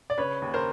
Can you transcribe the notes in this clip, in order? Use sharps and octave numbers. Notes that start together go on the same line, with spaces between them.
D5
C#3 B4 C#5
D#2
A#4 C5